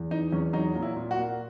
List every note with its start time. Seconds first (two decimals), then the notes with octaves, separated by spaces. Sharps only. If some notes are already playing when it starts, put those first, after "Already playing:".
Already playing: E2
0.11 E3 D#4
0.32 E2 C#4
0.53 F#3 D#4
0.75 A#2
0.82 E4
0.97 A#2
1.11 F#4
1.18 A#3